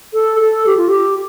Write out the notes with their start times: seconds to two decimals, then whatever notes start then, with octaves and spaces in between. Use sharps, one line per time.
0.14 A4
0.40 A4
0.66 G4
0.77 F4
0.89 G4